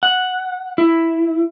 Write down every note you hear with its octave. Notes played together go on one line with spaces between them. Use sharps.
F#5
E4